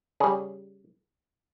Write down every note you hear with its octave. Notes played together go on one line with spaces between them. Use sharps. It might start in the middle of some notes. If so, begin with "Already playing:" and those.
C#3 G3 G#4